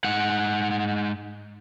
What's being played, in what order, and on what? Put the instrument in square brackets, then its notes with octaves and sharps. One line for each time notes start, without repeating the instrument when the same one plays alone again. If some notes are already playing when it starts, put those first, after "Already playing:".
[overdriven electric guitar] G#2 F#5